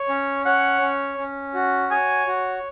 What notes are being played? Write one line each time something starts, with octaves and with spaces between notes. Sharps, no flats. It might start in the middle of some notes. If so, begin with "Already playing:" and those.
Already playing: C#5
C#4
C#5 F#5
C#4
C#4
F#4
C#5 G#5
F#4